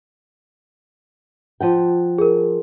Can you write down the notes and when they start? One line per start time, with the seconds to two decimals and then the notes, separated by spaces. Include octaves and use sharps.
1.60 F3 F#5 G5
2.18 G#4 A#4